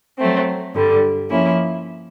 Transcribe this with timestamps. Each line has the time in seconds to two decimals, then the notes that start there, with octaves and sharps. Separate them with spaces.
0.18 F#3 A3 C4
0.75 G2 D3 G3
1.30 F3 A#3 C#4 E4